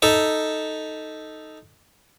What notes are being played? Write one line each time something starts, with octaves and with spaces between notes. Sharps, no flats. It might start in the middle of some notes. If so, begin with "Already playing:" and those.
D#4 A4 E5